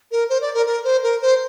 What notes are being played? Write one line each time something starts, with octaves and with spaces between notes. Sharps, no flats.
A#4
C5
D5
A#4
A#4
C5
A#4
C5